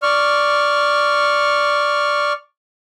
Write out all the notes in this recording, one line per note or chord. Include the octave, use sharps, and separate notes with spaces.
D5 C#6 F6